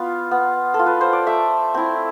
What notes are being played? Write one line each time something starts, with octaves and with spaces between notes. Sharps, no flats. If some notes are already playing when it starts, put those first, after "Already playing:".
Already playing: B3 F4 F5
B3
A4
F4
B4
C5
D5
A3 E5
C4 E4